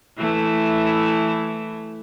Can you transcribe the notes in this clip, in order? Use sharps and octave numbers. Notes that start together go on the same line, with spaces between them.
E3 A3 E4